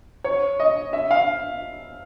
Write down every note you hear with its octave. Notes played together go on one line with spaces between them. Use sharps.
C#5
D#5
E5
F5